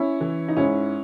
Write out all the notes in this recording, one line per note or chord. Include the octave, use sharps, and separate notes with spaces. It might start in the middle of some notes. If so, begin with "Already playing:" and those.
Already playing: C#4 E4
E3
D#4
G#2 C#4 E4